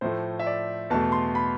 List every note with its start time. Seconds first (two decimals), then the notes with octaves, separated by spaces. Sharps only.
0.01 A2 F3 A3 C5
0.39 E5
0.47 D5
0.90 E2 B2 A3 A5
1.12 C6
1.35 B5